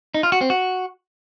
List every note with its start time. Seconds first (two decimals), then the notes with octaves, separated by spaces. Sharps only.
0.14 D#4
0.23 F4
0.32 F#4
0.41 C4
0.50 F#4